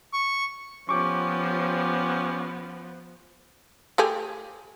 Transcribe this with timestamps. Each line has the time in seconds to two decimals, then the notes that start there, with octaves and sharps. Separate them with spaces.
0.13 C#6
0.89 F3 B3 C#4 G4 C#5 C#6 D6
3.98 A3 G4 G#4